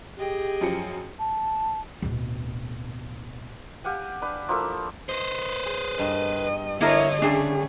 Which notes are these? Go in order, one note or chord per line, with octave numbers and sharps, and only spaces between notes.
G4 G#4 D#5 G5
F#2 F3 C#7
A5
D1 B2
G4 F5 F#5 G#5
D4 B4
F3 A#3 E4 A4
B4 C5 D#5
G#4
G2 D#5
D3 D4 E4 A#4 C#5 D#5
C#3 G3 A3 D4 G#4